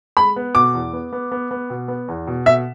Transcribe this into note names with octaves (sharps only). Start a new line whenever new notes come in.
G#3 B5
B3
B2 D6
E2
B3
B3
B3
B3
B2
B3
E2
B2
B2 E5